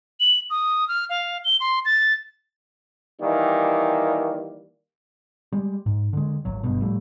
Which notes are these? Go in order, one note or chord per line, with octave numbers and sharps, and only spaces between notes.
F#7
D#6
F6
F5
G7
C6
A6
D#3 E3 G3 A#3
G3 G#3
G#2
D3 G#3
G#1 F#3
G1 G2 B2
A2 F3 G3 A3